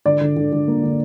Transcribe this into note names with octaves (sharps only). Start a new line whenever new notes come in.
D3 D5
D3
D3
D3
A#3
D3